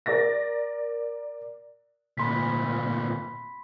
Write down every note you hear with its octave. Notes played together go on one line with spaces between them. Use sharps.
A#4 D5 A6 A#6
D2 A#2 B5 C6 B6